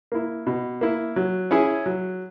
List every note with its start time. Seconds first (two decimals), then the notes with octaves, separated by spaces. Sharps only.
0.12 A#3 E4
0.46 B2
0.81 A#3 E4
1.16 F#3
1.51 C#4 E4 G#4
1.86 F#3